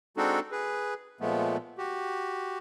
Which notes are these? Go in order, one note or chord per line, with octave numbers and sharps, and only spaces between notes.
G#3 C4 D4 D#4 F#4 A4
G#4 B4
A#2 F3 G#3 A3 B3
F#4 G4